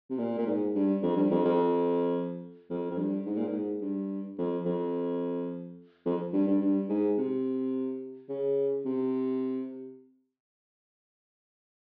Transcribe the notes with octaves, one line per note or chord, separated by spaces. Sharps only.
C3
A#2
A#2
G#2
G2
F2
G2
F2
F2
F2
F2
G2
G#2
A#2
G#2
G2
F2
F2
F2
G2
G2
G2
G#2
C3
C#3
C3